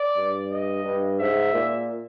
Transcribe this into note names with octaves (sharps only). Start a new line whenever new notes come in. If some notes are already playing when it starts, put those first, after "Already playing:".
Already playing: D5
G2
D#5
G2
G#2 E5
A#2